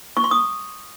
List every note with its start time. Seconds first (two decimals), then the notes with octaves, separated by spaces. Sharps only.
0.17 C#6
0.24 C6
0.31 D#6